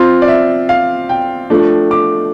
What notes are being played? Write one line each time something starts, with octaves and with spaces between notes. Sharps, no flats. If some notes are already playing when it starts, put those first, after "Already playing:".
Already playing: F3 C4 F4 C6
D5
E5
F5
G5
F3 A3 D4
D6